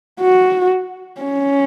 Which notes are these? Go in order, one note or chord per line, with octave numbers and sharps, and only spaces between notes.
F#4
C#4